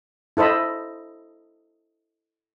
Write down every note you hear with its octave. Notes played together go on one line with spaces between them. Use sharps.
E4 A4 C5 D#5 B5